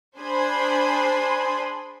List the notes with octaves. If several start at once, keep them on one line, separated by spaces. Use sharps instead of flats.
D4 G#4 C5 G#5 B5 C6